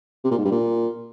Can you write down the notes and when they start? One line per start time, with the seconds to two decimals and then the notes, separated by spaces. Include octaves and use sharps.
0.24 C3
0.31 A#2
0.38 G#2
0.45 G2
0.52 A#2